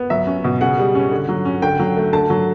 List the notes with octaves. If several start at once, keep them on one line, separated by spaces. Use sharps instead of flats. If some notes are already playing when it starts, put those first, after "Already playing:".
Already playing: B3
F#3 E5
C#4
B2
C#3 F#5
G3
C#4
D3
F#3
C#4
D3 G5
F#3
A3
D3 A5
F#3